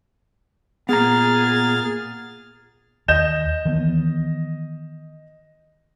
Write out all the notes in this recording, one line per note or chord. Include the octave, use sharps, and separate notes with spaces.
A#2 B3 G#4 A#5 F6 A6
D#2 D#5 G6 E7
D#3 E3 B3